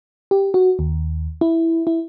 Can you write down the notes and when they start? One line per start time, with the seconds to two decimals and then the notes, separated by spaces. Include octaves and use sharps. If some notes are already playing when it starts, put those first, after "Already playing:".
0.31 G4
0.54 F#4
0.79 D#2
1.41 E4
1.87 E4